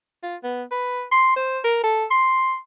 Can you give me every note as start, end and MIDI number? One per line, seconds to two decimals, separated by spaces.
0.23 0.36 65
0.44 0.64 59
0.71 1.03 71
1.12 1.32 84
1.36 1.59 72
1.64 1.79 70
1.84 2.05 69
2.11 2.57 84